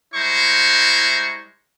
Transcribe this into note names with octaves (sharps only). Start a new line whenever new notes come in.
G3 G#3 E4 C5 A#5 C#6